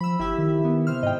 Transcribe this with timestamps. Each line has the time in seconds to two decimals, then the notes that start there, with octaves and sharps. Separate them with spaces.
0.01 F3 B5 E6
0.19 G1 E4 G4 E5
0.38 D#3
0.65 B3
0.87 C3 C5 F6
1.03 G#2 D#5 G5